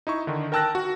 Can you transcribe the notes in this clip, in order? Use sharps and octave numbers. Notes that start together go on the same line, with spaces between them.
D#4 E4 C#6
D3 D#3
A#4 G5 A5 E6 F#6 A#6
F#4